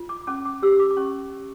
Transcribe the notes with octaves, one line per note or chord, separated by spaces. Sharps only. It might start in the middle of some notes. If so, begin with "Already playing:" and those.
Already playing: F4
D6
C#4 D6
D6
G4 E6
D6
D6
C#4 C#6